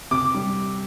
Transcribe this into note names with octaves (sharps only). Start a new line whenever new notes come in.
C3 D6
G3